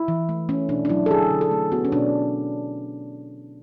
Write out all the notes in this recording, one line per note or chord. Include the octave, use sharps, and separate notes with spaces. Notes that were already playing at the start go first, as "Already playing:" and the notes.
Already playing: E4
E3
A3
A3 C#4
B2 D4
D4
F#3 E4
A4
D3 G#4
D3
A4
A3
B3 F#4
C#4
B2 D4